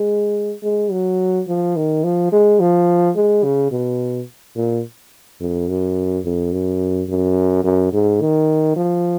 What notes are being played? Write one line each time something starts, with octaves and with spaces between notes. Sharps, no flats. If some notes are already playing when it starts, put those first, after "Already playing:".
Already playing: G#3
G#3
F#3
F3
D#3
F3
G#3
F3
G#3
C#3
B2
A#2
F2
F#2
F2
F#2
F#2
F#2
G#2
D#3
F3